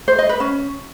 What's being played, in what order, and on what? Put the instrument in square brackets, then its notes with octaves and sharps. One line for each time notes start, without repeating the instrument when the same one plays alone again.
[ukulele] C5
D#5
B4
C#4